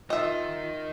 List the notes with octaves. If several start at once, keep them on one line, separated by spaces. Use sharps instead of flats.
D#4 F4 A#4 D#5 E5